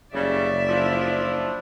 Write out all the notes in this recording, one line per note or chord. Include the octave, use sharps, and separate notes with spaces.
F#1 C#3 G3 D5 E5
F3 D4 E4 F4